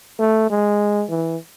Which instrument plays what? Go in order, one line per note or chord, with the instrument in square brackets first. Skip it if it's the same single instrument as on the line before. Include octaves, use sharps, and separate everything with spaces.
[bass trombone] A3
G#3
E3